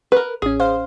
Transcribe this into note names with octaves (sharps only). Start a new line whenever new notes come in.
A#4 B4
A1 C#4 G#4
C5 F5